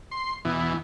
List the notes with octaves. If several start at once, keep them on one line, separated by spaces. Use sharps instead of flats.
C6
E2 B2 E3